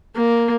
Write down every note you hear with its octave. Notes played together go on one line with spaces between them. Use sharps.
A#3